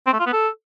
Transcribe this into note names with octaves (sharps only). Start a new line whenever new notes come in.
C4
A3
F4
B3
A4